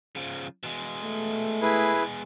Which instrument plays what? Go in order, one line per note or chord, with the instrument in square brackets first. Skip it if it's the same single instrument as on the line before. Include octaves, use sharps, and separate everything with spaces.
[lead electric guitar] C#3 F3
B2 G#3
[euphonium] A3
[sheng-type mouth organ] E4 G#4 B4